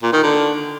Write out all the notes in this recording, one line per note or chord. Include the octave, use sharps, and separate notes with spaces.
A#2
D#3
D3